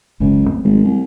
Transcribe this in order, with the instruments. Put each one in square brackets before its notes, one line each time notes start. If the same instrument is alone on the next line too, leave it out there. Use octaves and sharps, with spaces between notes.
[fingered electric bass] F#1 F#2 C#3 [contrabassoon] C#2
[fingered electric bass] F#3 A3 C4
[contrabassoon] G#1 [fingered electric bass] F#3 G#3 A3
[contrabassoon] C2